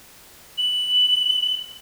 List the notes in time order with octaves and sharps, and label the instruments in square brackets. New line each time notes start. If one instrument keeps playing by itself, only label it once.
[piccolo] F#7